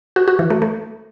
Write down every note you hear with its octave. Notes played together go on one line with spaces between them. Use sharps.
F#4
F#4
E3
A3
A3